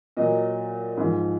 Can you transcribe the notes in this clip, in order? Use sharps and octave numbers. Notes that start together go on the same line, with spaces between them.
A#2 F#3 D#5
G#2 F3